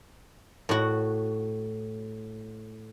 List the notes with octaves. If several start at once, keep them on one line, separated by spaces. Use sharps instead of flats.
A2 F#4